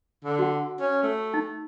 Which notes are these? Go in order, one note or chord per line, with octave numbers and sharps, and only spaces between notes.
D3
F#4 F#5
C#4
A3
D#4